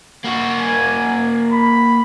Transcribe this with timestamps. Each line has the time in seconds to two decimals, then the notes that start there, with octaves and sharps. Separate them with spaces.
0.24 A#3 F#4
0.58 G#5
1.52 B5